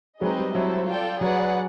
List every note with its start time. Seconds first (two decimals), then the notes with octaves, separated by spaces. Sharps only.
0.21 F#3 G#3 C4 D#4 G#4 B4 D#5
0.38 G3
0.54 F#3 C4 E4 A4 C5
0.87 F4 A4 D5 G5
1.21 F#3 G#4 B4 D5 F#5